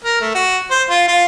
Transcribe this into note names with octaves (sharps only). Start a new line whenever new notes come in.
A#4
A3
F#4
C5
F4
F4